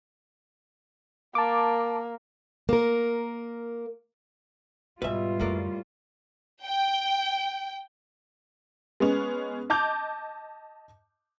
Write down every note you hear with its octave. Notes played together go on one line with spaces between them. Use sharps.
A#3 A5 D6
A#3 A#4
G#2 B2 D#3 G3 F4 B4 E5
F#2 A2 D3 A#3 D5
G5
G#3 B3 C#4
D#5 A5 D6 G6 F7